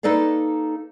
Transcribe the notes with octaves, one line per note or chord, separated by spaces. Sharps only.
A#3 D#4 A4 B4 D5 F5